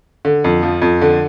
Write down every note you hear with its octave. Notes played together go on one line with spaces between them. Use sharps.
D3
F2
F3
F2
D3